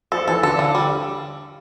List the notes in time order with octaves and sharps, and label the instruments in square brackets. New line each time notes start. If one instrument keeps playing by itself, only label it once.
[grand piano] F3 [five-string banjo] A4
[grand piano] E3 [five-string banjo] A4
[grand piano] D3 [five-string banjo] A4
[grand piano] D3 [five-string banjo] F3
[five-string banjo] G3